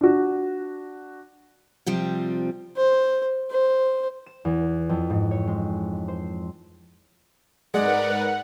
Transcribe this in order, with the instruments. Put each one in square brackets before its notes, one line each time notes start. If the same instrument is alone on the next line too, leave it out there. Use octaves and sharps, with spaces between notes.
[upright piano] D4 F#4
[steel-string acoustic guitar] C3 F3 G3 C4
[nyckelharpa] C5
C5
[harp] E7
E2
F2
G#2
C#5
G#3
C5
[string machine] G#2 A#4 B4 [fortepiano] G#3 [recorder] D5 [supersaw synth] F#5